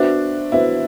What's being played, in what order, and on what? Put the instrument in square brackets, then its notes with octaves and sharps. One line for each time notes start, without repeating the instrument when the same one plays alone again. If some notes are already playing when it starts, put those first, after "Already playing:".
Already playing: [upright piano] B3 F#4 C5 E5 [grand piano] D4
[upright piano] B3 F#4 C5 E5 [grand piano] E4